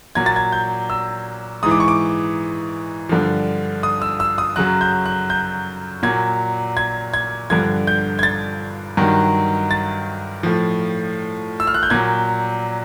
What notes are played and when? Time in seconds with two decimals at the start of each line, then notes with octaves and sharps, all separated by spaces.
0.15 A#2 F#3 G#6
0.26 A6
0.36 G#6
0.52 G6
0.90 E6
1.63 G#2 E3 D#6
1.71 D6
1.80 C#6
1.88 D6
3.09 G2 D3 F3
3.83 D#6
4.02 E6
4.20 E6
4.38 D#6
4.56 F#2 C#3 F#3 F#6
4.81 G6
5.06 F#6
5.30 G6
6.03 A#2 F#3 G#6
6.77 G#6
7.14 G#6
7.50 G2 D3 F3 G#6
7.87 G6
8.19 G#6
8.23 A6
8.97 G2 D#3 F#3
9.71 A6
10.43 A2 F3
11.60 E6
11.67 F6
11.74 F#6
11.83 G6
11.90 A#2 F#3 G#6